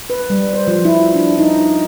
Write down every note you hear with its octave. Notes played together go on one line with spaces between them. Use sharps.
B4
G3
C5
F3
E4
D4
D#4